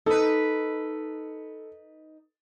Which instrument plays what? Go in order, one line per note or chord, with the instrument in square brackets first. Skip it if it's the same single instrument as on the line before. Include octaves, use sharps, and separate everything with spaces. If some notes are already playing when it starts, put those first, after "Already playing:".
[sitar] D#4 B4 [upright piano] A4